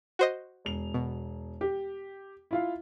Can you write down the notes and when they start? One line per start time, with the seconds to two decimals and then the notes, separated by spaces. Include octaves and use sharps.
0.19 F#4 C5 D#5
0.65 E1 F7
0.94 B2
1.61 G4
2.51 E4 F4 F5